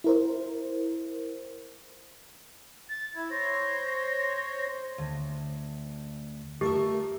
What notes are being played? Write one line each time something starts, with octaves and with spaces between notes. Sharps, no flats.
E4 A#4 C5
A6
E4 G#6
C5 C#5 A#6
D2
A3 G4 A#4 E5